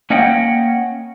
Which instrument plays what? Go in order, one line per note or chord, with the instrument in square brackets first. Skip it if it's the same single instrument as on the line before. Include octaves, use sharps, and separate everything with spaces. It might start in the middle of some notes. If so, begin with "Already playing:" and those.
[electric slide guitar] A#3 C#4 C#5 D#5 F#5 G5